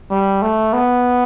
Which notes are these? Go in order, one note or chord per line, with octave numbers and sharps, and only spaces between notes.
G3
A3
B3